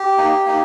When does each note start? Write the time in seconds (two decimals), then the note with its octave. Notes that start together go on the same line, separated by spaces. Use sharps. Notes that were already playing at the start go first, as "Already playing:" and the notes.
Already playing: G4
0.18 A#3 D#4
0.46 A#3 D#4